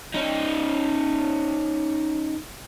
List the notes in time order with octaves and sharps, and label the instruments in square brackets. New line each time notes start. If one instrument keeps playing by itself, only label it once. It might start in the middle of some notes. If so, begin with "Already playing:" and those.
[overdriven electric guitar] C#4 D#4